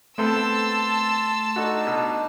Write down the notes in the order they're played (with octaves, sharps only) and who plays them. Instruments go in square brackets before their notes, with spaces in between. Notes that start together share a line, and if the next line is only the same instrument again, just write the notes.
[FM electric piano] A3 [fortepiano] B3 C4 A4 [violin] A5 E6 [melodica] C6
[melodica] D4 D#4 [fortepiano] F#4 A4
[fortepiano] B2